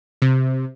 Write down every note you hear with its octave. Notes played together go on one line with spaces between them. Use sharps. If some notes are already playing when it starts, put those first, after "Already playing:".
C3